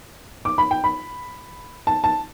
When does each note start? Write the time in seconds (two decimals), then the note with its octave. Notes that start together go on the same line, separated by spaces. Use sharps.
0.45 D6
0.58 B5
0.71 G5
0.84 B5
1.87 A5
2.04 A5